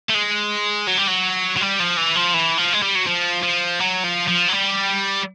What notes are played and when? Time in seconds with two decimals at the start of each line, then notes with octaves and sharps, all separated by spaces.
0.09 A3
0.14 G#3
0.87 F#3
0.98 G3
1.08 F#3
1.57 F#3
1.61 G3
1.80 F3
1.97 E3
2.16 F3
2.34 E3
2.58 F3
2.73 G#3
2.83 G3
2.95 F#3
3.07 F3
3.43 F3
3.80 F#3
4.04 F3
4.28 F3
4.48 F#3
4.53 G3